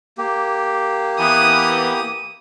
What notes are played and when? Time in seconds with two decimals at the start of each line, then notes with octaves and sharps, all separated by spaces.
0.18 A#3 G4
1.20 E3 B3 D#6